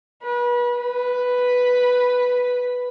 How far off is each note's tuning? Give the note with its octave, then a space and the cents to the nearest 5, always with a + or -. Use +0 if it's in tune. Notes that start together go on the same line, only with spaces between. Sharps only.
B4 -30
B4 +0